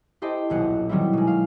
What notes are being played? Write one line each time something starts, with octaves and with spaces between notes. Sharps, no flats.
E4 G4 A4 C5 D#5
D#1 B1 F#5
D#3 F#3 G3 C4 E4
B2 G#3
F5